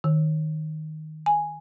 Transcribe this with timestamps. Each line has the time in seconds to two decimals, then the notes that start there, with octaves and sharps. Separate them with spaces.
0.04 D#3
1.26 G#5